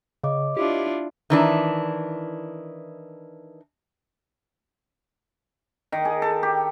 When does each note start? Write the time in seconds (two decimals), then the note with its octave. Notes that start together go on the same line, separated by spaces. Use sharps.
0.24 C#3 C#5 D#5 D6
0.57 D4 E4 F4 G4
1.30 D#3 E3 D4
5.92 D#3
6.05 G#4
6.22 A4
6.43 G4